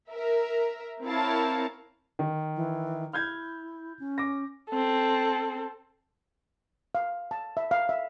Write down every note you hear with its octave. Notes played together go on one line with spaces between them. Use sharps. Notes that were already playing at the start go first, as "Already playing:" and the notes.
A#4 E5
C4 E4 A#4 C#5 F5 A5
D#3
E3
E4 F6 G6 G#6
C#4
D6 A#6
C4 A4
F5
A5
E5
F5
E5